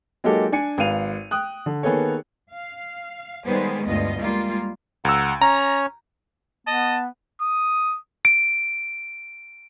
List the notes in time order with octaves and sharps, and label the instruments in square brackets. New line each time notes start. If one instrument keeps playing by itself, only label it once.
[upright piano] F#3 G#3 A#3 D#4 G4 A4
D4 G#5 C#7
G#1 B4 F5 D#7 F7
G5 D#6 F#6
D3
D#3 A#3 B3 G#4 A4 C#5
[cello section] F5
D#3 G3 G#3 B3 G#4 C5
D2 G2 B3 F4 D#5
G3 G#3 A#3 F4
[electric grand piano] C#2 E6 [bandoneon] F#5 A#5
[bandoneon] C#4 C#5 [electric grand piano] A#5
[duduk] B3 [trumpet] D#5 [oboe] A5
[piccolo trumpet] D#6
[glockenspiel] D7